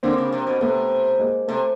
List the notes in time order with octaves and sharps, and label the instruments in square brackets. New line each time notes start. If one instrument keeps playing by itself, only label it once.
[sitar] D3 [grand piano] A#3 C4
[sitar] C#3
C3
B2
[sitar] C3 [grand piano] A3 B3
[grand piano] G#3 A#3
[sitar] C3 [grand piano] A3